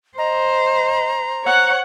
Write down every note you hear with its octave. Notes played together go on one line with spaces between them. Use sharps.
C5 D#5 A#5
C5 C#5 F#5